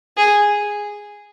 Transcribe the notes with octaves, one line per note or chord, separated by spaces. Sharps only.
G#4